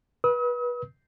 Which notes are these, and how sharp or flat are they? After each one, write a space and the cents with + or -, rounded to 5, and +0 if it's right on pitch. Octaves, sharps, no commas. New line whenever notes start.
B4 -25 D#6 +45